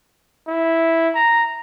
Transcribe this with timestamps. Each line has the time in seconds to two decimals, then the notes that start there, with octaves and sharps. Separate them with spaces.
0.47 E4
1.15 A#5